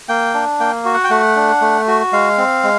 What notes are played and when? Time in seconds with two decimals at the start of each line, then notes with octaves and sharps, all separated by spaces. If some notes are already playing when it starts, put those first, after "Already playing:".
0.09 A#3 G5
0.34 D4
0.60 A#3 G5
0.85 F#4
0.94 F#5
1.04 G5
1.10 A3 F#5
1.36 D4
1.61 A3
1.88 F#4
2.12 G#3 F5
2.38 C4
2.63 G#3